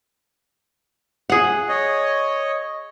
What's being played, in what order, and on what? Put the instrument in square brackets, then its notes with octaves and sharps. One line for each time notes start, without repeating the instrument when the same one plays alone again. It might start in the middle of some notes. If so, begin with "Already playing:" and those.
[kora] G#4 F#5
[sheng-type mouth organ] C#5 D#5